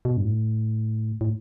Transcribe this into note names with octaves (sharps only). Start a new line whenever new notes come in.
B2
G2
A2
A2